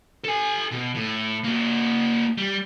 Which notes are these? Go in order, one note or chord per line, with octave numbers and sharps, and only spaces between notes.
A4 G#5
B2
A2
A#3 F#4
G3